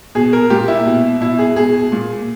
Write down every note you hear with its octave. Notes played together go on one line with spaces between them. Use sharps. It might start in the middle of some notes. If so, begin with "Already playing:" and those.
B2 G#4
A#4
A#2 G4
E4
B2
B2 E4
G#4
B2 G#4
A#2